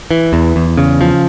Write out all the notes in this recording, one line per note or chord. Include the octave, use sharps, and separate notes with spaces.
E3
E2
E2
C#3
F3